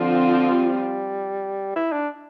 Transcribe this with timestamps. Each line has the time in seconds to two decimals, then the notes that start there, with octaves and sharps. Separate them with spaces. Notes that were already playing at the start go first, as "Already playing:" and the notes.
Already playing: D3 F3 C4 F4
0.51 G3
1.76 E4
1.92 D4